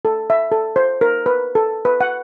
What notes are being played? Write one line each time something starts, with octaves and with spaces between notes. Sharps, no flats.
A4
E5
A4
C5
A#4
B4
A4
B4
F#5